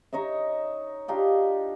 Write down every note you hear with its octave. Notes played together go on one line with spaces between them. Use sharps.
D#4 C#5 D#5 E5
D4 D#4 F4 G4